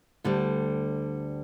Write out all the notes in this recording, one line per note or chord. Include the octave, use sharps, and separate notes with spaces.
D2 D3 G3